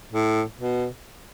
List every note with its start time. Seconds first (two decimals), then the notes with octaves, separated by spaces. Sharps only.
0.12 A2
0.57 B2